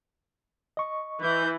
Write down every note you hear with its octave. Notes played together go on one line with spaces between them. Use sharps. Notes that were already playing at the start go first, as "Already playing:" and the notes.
D#5 C#6
E3 G6